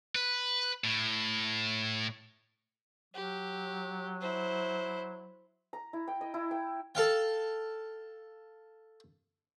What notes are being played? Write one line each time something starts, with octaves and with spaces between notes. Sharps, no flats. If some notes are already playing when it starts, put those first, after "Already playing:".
B4
A2
F#3 G4
E4 C5
A#5
E4
G5
D#5
E4
G5
A4 F5 G5